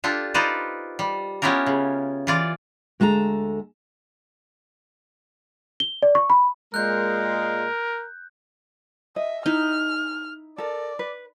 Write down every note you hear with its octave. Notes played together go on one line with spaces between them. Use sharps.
D4 F4 G4 A4
D#4 F4 B4 C5 D5
G3
B3 C#4 E4 F4 G4 A#4
C#3
E3 F4 D5
D2 G#3 A4 F#5 A#5
G7
D5
C#6
B5
A#2 G#3 A#4 F#6 G6
D#5 E5
D#4 E4 F6
A4 A#4 D5
B4